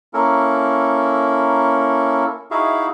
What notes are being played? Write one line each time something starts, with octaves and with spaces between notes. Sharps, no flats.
A#3 C#4 E4 A4 A#4
D#4 E4 F#4 G#4 E5 F5